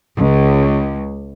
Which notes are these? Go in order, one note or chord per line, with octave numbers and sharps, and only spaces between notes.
C#2